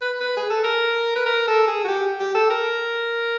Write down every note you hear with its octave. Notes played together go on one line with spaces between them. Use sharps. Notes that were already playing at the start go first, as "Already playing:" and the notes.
B4
B4
G#4
A4
A#4
B4
A#4
A4
G#4
F#4
G4
G4
A4
A#4